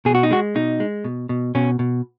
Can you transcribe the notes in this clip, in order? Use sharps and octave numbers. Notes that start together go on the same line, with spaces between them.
B2 G#4
F#4
D#4
G#3 F#4
B2 D#4
G#3
B2
B2
B2 C#4
B2